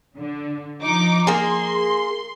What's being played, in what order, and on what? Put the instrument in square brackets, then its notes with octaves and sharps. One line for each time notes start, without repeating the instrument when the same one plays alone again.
[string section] D3
F3 D#4 D6
[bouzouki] A#3 G#4 [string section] C6